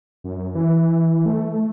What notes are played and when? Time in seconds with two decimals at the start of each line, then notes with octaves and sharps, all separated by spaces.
0.24 F#2
0.55 E3
1.26 A3